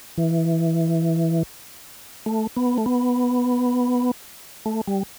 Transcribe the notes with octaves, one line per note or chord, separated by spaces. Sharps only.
E3
A3
B3
A3
B3
A3
G3